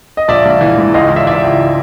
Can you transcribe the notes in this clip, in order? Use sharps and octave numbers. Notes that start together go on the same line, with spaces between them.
D#5
A#1 D5 E5
A#1
E3
G#2
C#2 D#5 F5
E3
D5 E5
E3 D5 E5
C#2